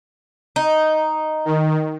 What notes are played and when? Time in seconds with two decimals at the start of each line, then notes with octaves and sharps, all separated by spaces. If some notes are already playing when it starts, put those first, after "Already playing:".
0.56 D#4
1.45 D#3